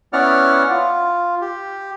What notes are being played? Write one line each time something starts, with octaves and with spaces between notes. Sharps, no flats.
B3 C#4 E4 D5 F#5 F6
F4
G4